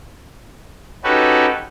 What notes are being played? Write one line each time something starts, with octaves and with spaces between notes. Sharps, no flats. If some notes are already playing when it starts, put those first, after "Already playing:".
C#4 D#4 F#4 G4 A4 B4